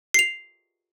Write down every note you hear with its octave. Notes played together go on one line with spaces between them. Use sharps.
C7 F7